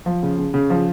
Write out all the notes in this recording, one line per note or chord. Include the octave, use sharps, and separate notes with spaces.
F3
C#3
C#3
C#3
F3